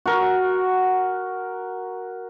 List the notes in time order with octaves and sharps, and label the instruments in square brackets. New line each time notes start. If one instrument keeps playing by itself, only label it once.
[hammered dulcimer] F#4 A#4